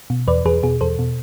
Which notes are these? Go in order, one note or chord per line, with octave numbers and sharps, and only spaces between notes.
B2
E2 B4 D5
E2 G#4 B4
B2 G#4
E2 A4 C5
B2